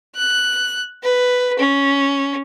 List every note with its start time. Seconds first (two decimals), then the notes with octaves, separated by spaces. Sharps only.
0.15 F#6
1.03 B4
1.59 C#4